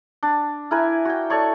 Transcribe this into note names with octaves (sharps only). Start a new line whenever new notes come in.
D4
E4 A#4 B4 G#5
F#4 G5
A4 C#5 D5 C#6